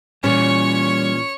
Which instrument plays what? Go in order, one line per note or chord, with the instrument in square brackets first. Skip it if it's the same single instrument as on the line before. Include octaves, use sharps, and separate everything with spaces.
[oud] A#2 E3 [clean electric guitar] G3 [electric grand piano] C#4 [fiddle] C#5 C#6